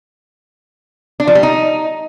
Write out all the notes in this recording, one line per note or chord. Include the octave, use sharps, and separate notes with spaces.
D4
F3
G3
D#4